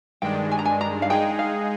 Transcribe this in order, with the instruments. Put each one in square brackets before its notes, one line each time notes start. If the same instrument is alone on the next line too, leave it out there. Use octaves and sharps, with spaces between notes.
[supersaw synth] G2 D#3 G#3 D4 [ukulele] G5
[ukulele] G#5
A#5
G#5
A#5
F5
[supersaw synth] G#3 D#4 G#4 [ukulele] G5
[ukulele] F5